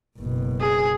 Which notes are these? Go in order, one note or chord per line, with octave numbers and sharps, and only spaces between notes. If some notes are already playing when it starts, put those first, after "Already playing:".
F#1 B2
G#4